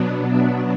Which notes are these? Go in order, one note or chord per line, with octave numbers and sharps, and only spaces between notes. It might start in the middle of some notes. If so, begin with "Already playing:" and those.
Already playing: B2 F#3 B3 D4
D5 E5